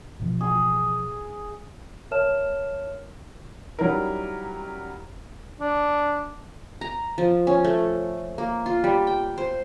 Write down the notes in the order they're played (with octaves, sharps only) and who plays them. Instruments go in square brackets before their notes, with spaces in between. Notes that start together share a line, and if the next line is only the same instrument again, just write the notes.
[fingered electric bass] A1 B2 F3
[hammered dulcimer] G#4
[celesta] A#4 C#5 E5 A5 F6 E7
[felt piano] F#3 G3 C#4 D#4 E4 A#4
[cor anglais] D4
[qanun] A#5
F3
C#4
A3
A#3
F4
G3
G5
C5